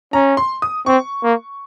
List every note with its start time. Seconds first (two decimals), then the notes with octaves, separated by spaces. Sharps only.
0.13 C#4 A#5
0.37 C6
0.62 D#6
0.86 C4 C#6
1.23 A#3